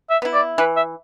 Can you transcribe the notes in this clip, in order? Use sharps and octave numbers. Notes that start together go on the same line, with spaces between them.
E5
B3 E4
D5
E3 B4
E5